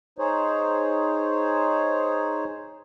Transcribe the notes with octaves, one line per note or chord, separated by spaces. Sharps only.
D#4 G#4 C5 C#5